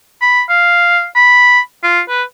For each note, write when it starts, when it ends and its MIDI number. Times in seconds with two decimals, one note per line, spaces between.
0.21 0.41 83
0.49 1.05 77
1.15 1.60 83
1.83 2.00 65
2.09 2.23 71